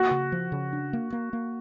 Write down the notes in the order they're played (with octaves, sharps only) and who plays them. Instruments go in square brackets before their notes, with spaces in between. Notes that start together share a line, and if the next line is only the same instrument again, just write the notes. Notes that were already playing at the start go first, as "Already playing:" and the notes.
Already playing: [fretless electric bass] A#3 [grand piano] F#4
[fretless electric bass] C#3
F3
C#3
D4
A#3
A#3
A#3